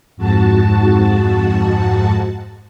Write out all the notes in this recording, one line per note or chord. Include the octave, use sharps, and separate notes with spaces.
F2 G#2 F#4 A5